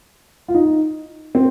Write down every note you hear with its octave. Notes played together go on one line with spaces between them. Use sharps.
F4
D#4
C4